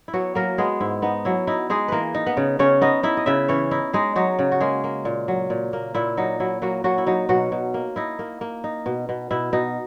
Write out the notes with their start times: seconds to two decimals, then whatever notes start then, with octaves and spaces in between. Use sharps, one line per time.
0.08 E4
0.13 F#3 B3 F#4
0.35 F#3 A#3 A#4
0.58 G#3 B3 G#4
0.80 G#2 E4
1.02 B3 D#4
1.25 F#3 E4
1.47 D#4 E4
1.70 G#3 D#4 G#4
1.88 E3 A#3 A#4 B4
2.14 D#4
2.26 B3 B4
2.37 C#3
2.59 C#3 C#4 C#5
2.81 B3 D#4 D#5
3.03 D#4 E4 E5
3.17 D#5
3.26 C#3 E4 E5
3.48 E3 C#4 C#5
3.71 D#4 E4
3.93 G#3 D#4 G#4
4.16 F#3 D#4 F#4
4.39 C#3
4.52 F#4
4.60 G#3 A#3 G#4
4.84 A#3
5.05 A#2
5.28 F#3
5.50 A#2
5.73 A#3
5.95 A#2 E4
6.17 F#3 D#4
6.40 F#3 E4
6.62 F#3 A#3 F#4
6.84 F#3 A#3 F#4
6.98 E4
7.07 F#3 D#4
7.29 B2 F#3 F#4
7.52 B2
7.74 A#3
7.96 D#4 E4
8.19 A#3
8.41 A#3
8.64 D#4
8.86 B2
9.09 B2
9.31 B2 E4
9.53 B2 D#4